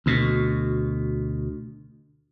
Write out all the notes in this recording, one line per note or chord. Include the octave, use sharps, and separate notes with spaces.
D2 B2